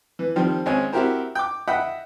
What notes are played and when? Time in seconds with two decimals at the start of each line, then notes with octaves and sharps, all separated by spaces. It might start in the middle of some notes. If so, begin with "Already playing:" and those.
0.19 E3
0.36 D#3 F3 G3 C4
0.66 G#1 G#3 C4 C#4 G#5
0.92 C4 E4 F#4 G4 A#4 C5
1.35 G5 D6
1.68 D#5 E5 F#5 G5 B5